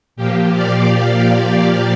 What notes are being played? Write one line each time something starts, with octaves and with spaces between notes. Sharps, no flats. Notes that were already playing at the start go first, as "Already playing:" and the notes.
A#2 F3 A#3 G4
D5 F5